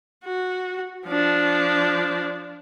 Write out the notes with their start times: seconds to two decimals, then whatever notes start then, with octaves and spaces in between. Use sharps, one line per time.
0.24 F#4
1.08 F3 D4